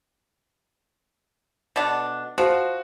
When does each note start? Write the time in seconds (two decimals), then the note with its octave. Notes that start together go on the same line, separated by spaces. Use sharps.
1.76 B2 A3 D4
2.38 F3 F#4